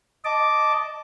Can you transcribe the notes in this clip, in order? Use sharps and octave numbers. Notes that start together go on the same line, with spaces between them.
D#5 A5 D6